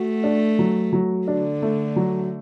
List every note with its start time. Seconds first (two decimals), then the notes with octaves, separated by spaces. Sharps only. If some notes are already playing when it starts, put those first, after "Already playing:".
Already playing: A3 F#4
0.24 D4
0.59 F#3
0.93 F#3
1.28 D3 D4
1.62 A3
1.96 F#3